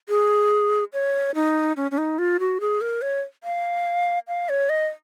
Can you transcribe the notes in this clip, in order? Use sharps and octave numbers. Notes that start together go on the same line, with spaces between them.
G#4
C#5
D#4
C#4
C#4
D#4
F4
F#4
G#4
A#4
C#5
F5
F5
C#5
D#5